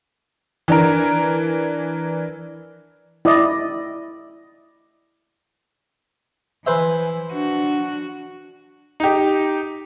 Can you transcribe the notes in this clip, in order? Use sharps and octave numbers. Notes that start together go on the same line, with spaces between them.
E3 D4 A#4
E4 D5 D#5
E3 B4 C5 E5 G#5
D4 F#4
D#4 G4